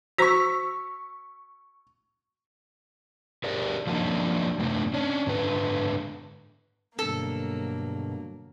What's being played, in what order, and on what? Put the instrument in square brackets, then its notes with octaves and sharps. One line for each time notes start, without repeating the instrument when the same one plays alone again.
[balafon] F#4 C5 A#5 [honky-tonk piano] C#6 E6 B6
[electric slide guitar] G4 G#4 A#4 D5
F3 F#3 A#3 D4 D#4
F#2 A2 C3 A3 B3 D4
C#4 D4
G#2 D3 B4
[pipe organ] G2 B2 D3 [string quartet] F#3 A#3 [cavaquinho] A4